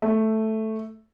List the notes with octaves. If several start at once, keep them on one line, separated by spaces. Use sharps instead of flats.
A3